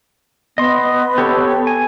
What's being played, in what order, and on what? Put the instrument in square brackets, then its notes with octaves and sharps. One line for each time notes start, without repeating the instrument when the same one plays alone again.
[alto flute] B3 [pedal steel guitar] D#5 C6
[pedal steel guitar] G4 A4 C#5
G#5